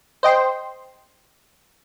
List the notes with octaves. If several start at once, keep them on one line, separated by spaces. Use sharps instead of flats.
C5 D#5 G5 C6